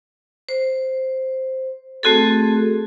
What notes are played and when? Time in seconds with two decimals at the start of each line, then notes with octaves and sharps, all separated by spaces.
0.49 C5
2.03 A3 C4 F#4 G#4 A4